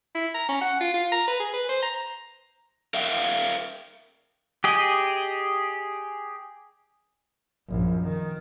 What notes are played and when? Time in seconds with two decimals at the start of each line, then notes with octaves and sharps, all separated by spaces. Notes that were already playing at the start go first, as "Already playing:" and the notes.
0.15 E4
0.35 A#5
0.49 C#4
0.61 F#5
0.81 F4
0.94 F4
1.12 A#5
1.28 B4
1.40 G#4
1.54 B4
1.69 C5
1.83 A#5
2.94 A#4 E5 F5 G5
4.64 G4 G#4 D#5
7.68 A#1 F#2
8.02 D#3